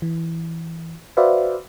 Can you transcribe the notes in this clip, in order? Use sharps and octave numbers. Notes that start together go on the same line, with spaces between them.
E3
F#4 B4 C5 D5 E5 F5